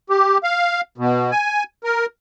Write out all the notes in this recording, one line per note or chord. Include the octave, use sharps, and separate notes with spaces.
G4
F5
B2
G#5
A#4